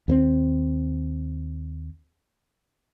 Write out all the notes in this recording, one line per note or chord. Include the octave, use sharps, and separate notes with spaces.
D#2 B3 C4